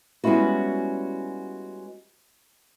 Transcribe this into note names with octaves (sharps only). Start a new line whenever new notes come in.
G3 G#3 B3 C#4 E4 F#4